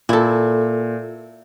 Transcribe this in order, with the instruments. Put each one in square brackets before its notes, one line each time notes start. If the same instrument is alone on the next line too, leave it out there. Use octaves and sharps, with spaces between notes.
[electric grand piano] A#2 [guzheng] E4 A4